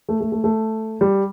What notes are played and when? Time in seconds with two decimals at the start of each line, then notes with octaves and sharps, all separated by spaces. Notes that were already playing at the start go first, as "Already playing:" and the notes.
0.09 A3
0.21 A3
0.32 A3
0.44 A3
1.01 G3